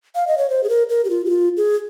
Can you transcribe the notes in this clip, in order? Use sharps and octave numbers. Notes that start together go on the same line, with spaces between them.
F5
D#5
C#5
C5
G#4
A#4
A#4
G4
F4
G4
F4
G#4